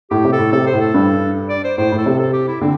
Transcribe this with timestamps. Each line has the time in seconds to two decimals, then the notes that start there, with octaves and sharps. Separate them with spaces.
0.11 A2 G4
0.24 C3
0.33 A4
0.39 A2
0.53 C3 A4
0.67 C5
0.73 A2
0.81 A4
0.94 G2
1.49 D5
1.64 C5
1.78 A2 C5
1.92 A2
1.98 A4
2.06 C3
2.19 A4
2.33 G4
2.48 E4
2.61 D3 C4